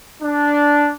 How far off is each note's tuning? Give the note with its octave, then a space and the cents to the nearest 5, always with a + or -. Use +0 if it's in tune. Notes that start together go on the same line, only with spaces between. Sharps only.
D4 -5